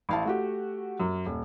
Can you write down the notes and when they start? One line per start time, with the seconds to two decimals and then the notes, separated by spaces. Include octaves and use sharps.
0.09 A1 F5 A5
0.25 A3 F#4 G4
1.00 F#2
1.26 D#1